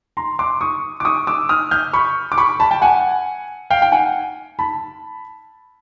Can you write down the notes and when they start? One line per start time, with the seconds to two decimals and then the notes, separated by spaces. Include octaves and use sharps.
0.17 A#5 C6
0.39 C6 D6
0.61 C#6 D#6
1.00 D6
1.05 C#6 D#6
1.27 D6 E6
1.49 D#6 F6
1.71 F6 G6
1.93 B5 C#6
2.32 D6
2.38 B5 C#6
2.60 A5 B5
2.71 G5 A5
2.82 F#5 G#5
3.70 F5 G5
3.82 G5
3.92 F#5 G#5
4.59 A5 B5